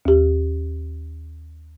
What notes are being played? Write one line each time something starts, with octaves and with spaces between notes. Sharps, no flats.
D#2 G4